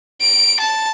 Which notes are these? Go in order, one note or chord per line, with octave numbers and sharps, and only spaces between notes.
D7
A5